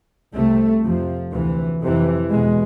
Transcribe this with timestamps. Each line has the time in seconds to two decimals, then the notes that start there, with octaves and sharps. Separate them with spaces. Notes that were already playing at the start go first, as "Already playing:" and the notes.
0.34 C2 C3 A3
0.83 F2 C3 F3
1.32 D2 C3 E3
1.82 F2 C3 E3
2.31 E2 B2 G#3